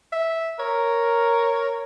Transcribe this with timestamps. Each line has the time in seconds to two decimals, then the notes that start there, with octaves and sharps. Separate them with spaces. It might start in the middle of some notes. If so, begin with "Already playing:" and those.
0.13 E5
0.60 A#4 C#5